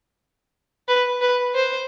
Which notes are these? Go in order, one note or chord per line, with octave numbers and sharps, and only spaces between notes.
B4
B4
C5